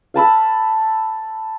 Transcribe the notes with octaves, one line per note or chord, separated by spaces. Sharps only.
F5 A5 B5 E6